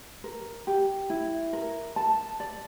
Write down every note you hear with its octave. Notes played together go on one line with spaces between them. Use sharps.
A#4
G4
E4
A#4
A5
D5